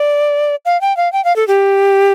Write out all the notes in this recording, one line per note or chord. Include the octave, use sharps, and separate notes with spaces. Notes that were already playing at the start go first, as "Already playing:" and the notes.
Already playing: D5
F5
G5
F5
G5
F5
A4
G4